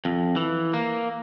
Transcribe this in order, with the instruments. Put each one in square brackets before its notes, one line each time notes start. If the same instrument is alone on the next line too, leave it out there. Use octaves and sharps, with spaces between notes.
[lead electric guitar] F2
E3
A#3